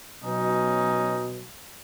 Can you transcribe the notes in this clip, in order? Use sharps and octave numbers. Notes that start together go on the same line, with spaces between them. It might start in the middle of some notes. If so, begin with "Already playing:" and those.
B2 F#3 C#4 D#4